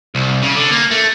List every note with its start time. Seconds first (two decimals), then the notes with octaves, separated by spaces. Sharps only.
0.15 C2
0.42 C#3
0.56 D3
0.71 A#3
0.91 A3